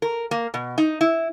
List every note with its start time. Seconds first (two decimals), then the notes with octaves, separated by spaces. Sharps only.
0.02 A#4
0.31 A#3
0.54 B2
0.78 D#4
1.01 E4